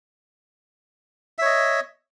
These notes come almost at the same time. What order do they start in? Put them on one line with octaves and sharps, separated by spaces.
E5 C#5 D#5